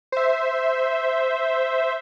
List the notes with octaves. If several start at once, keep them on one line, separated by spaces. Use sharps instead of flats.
C5 E5